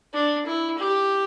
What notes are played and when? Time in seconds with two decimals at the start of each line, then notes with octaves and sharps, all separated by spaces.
0.13 D4
0.46 E4
0.78 G4